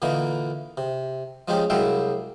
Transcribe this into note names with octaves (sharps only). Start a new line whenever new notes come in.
A#2 D3 E3 A#3 D#4
C3
F3 G#3 C#4 D#4 G4
C2 F#3 G#3 E5 F5 G5